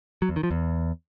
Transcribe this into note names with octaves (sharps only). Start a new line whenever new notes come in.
F#3
E2
D#3
F3
E2